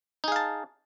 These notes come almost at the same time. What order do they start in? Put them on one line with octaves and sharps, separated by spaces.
D#4 G#4 F5 A5